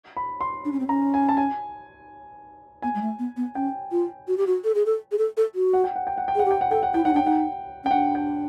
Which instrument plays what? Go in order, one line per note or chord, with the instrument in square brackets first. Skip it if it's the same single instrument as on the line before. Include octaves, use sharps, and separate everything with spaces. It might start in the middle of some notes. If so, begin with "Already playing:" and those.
[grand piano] B5
C6
[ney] D4
C#4
C4
[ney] C#4 [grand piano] A#5
[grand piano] G#5
A5
G#5
[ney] B3 [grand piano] G#5
[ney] G#3
A3
B3
B3
[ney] C#4 [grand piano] G5
[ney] F4
F#4
G4
F#4
A4
G#4
A4
G#4
A4
A4
F#4
[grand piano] F#5
G5
F#5
G5
F#5
G5
[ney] G#4 [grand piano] F#5
[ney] G4
[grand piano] G5
F#5
[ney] A4 [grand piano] G5
[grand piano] F#5
[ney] E4 [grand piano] G5
[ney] D#4 [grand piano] F#5
[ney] D4 [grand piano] G5
[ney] D#4 [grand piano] F#5
[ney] C#4 [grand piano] G5
[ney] D4 [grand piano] F#5
[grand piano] G5